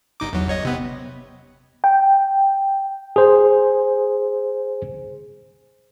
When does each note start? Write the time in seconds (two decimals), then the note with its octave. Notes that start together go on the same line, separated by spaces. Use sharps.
0.20 G1 D#4 D6
0.33 E2 F#3
0.48 G1 C#5 D#5
0.65 C3 B3
1.84 G5
3.16 G#4 C5